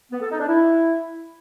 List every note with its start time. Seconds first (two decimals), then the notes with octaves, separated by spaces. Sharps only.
0.12 B3
0.21 A4
0.30 D#4
0.39 D4
0.49 E4